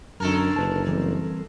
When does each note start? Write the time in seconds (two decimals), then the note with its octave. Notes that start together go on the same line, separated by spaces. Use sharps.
0.20 F#2 D3 A4 A#4
0.56 F#1 B4 A5
0.87 E3 G3 C4